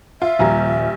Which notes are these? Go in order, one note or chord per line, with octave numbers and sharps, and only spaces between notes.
F4 E5
D#1 A#1 G3 G#5 A#5